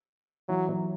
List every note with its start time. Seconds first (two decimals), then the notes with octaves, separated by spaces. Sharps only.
0.48 E3 F#3
0.69 F#3